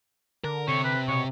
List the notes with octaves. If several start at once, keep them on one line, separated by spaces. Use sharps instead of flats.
D3 A#4
C3 C#5
B4
B2 C#5